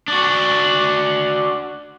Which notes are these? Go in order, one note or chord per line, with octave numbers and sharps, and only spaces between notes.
D4 F#4